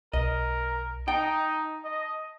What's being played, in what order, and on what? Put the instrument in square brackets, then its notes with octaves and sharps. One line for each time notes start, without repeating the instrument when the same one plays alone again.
[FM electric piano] B1 [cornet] A#4 [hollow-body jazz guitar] D#5
[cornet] D#4 [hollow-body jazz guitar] G5 [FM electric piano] A5
[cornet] D#5